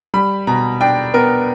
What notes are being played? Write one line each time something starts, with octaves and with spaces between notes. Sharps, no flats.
G3 B5
B2 A#5
D4 G5
B3 A#4